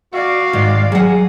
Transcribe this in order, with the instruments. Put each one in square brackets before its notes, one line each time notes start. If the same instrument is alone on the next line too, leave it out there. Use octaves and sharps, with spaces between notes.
[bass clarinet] F#4 [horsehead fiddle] D5 F5
[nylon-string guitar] G#2 D#3
[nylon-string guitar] F#3 F#5 [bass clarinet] G#4